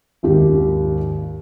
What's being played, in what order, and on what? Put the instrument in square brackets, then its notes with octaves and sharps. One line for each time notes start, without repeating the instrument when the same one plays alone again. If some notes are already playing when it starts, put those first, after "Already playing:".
[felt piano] G#1 D#2 G4